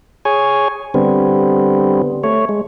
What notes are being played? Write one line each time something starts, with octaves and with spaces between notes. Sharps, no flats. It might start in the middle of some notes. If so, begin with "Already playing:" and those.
G#4 C#5 G#5
D3 G3 B3 C4
A3 C#5
G#3